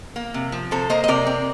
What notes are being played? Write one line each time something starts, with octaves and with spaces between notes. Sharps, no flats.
A#3
C3
F3
C3 A4 C5
A#3 C5 D#5
D#5
C3 A#4 D5
C4